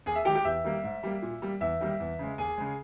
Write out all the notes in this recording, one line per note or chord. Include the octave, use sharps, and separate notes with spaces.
D#2 G#4 G#5
E5
D#3 G#3 G4 G5
G4 G5
E2 E5
D#3 G3 A#3
G#2
G3 A#3
A#2
G3 A#3
E2 E5
D#3 G3 A#3
E2
C#3 G#3
D#2 G#4 G#5
C#3 G#3